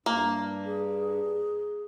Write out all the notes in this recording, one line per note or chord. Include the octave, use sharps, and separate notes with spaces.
G2 A#3
G#4